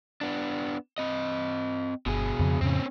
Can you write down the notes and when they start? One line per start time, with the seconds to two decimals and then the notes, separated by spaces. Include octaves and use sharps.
0.21 B3 D4
0.98 C4 D#5
2.06 G1 B2 G#4
2.39 F2 C#3 F3
2.61 F2 A2 C#3 C4 C#4